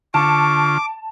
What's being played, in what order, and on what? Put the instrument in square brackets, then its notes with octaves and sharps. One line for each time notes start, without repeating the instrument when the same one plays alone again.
[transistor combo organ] D3 F4 [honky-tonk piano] A5 [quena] C#6 [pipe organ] D6